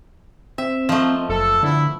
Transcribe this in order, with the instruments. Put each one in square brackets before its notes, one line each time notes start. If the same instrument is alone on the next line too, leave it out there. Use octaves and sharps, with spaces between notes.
[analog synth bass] C4 [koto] E5
[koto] F3 A3 [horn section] A#3 C5 D#5
[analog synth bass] F#1 [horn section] A4
[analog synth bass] D3 [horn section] B3 E4